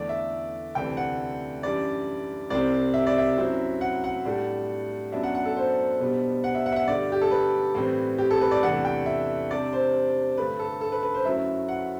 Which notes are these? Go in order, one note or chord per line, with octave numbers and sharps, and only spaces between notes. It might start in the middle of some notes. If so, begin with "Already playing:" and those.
Already playing: E2 D3 A3 D5
E5
D2 C3 E3 A3 D4 G5
F#5
F#2 E3 G3 D4 D5
C2 C3 G3 C4 D5
E5
D5
E5
F#2 F#3 C4 E4
F#5
F#5
A2 G3 D4
F#2 F#3 B3 D4 E5
F#5
F#5
A4
C5
B2 G3 B3 D4
F#5
E5
F#5
E5
F#5
G2 D3 G3 D5
G4
A4
B4
A2 E3 G3 C4
G4
A4
B4
D5
E2 C3 E3 A3 D4 F#5
G5
E5
C3 G3 D4 D5
C5
G2 D3 A3 B4
A4
A4
B4
B4
C5
F#2 F#3 A3 E4 E5
F#5